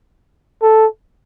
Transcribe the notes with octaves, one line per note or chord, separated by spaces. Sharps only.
A4